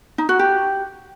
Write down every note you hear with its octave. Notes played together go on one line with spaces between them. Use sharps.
D#4
F#4
G4